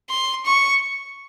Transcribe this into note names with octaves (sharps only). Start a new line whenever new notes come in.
C6
C#6